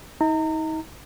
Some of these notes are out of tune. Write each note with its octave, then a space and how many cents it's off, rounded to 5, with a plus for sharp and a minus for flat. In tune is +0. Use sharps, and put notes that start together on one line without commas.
D#4 +40 A#5 -30